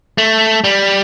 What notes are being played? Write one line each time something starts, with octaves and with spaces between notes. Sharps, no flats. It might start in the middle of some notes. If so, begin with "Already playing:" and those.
A3
G3